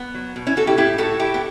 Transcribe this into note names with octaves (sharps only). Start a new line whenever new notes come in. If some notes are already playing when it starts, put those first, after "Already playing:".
Already playing: B3
F#3
B2
C#4 E4
B2 F#4 A4
E4 G4
A2 E4 G4
A2 F#4 A4
A2 E4 G4
B3